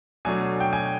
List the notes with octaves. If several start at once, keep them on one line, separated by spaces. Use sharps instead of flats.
B2 F#3 A3 D4 G#5
G5
G#5